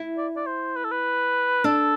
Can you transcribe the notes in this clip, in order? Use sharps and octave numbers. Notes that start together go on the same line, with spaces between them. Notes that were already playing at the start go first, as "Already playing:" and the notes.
Already playing: E4
D5
D5
C5
B4
A4
B4
D4 A4